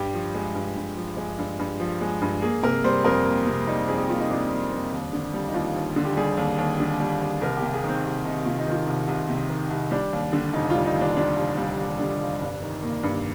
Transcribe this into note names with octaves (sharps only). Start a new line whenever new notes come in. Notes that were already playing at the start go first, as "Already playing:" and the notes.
Already playing: G2 G4
F3
G#3
G2
G2
F3
G#3
G2
G2
F3
G#3
G2
A#3 G#4
C3 A#4
G3 C5
F2 A#4
A#3
C3
G3 D#4
F2 G#4
G4
A#3 F4
D#4
C3 D4
G3
F2
D#2
D3
G3
D#4
D#2 F4
D#2
D3
G4
G3 G#4
D#2
D#2
D3
G3
D#2
C2 A#4
G4
C3
G#4
D#3
C4
C2
C2 D#4
C3 F4
D#4
D#3 F4
C2
C2
C3
D#3
C2
G3 D4
D#2
D3
F1 D#4
G3 F4
D#4
D#2
D4
D3 D4
F1
G3
D#2
D3
F1
G2
D#3
A#3
G2